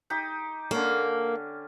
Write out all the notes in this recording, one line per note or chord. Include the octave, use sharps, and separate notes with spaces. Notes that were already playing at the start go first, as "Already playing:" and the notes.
D#4 G4
D3 A#3 C#4